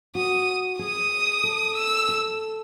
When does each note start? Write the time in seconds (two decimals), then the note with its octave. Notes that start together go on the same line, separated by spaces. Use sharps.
0.15 F#4 D#6
0.79 G#4 D#6
1.44 A4
1.76 E6
2.09 A4